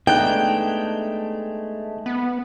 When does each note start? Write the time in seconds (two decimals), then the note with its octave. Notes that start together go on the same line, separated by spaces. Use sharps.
0.07 G#3 A3 B3 D4 D#4 G5 F#6
2.06 B3